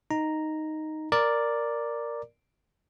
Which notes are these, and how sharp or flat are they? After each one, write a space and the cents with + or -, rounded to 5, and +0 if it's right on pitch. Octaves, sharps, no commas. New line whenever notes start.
D#4 +0 A#5 +0
A#4 +0 D5 +0